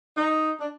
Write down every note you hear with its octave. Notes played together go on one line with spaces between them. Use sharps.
D#4
D4